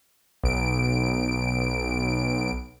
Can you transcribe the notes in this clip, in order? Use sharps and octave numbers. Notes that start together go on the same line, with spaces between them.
B1 D7